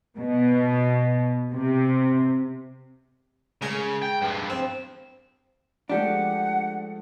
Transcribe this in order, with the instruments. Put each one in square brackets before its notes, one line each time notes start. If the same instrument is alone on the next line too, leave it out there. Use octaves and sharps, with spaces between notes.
[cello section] B2
C3
[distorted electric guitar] C#3 [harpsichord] G#3 A#4 G#5
[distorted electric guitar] G5
G2 F3
[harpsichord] C4
[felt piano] F3 G#3 A3 [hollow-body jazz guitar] D4 G4 [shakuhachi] F#5